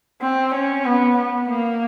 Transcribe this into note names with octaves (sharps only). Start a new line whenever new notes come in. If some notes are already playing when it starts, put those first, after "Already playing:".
C4
C#4
B3
B3
A#3